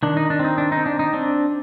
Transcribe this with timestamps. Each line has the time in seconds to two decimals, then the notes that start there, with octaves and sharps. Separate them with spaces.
0.03 D#3 D4
0.17 D#4
0.30 D4
0.39 C4
0.44 D#4
0.58 D4
0.72 C4 D#4
0.86 D4
0.99 D#4
1.13 C4 D4